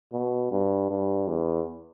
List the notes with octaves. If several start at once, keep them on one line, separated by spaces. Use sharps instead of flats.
B2
G2
G2
E2